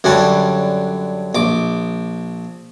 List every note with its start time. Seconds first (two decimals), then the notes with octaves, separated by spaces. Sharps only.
0.04 F#2 D3 G3 C#4 F#5 A5
1.35 A#1 D6